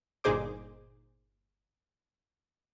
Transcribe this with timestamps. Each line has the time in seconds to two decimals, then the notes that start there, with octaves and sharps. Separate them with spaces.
0.24 G1 A#2 D#4 G#4 C5 D6